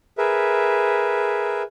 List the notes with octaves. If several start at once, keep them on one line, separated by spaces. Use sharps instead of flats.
G#4 A#4 B4 E5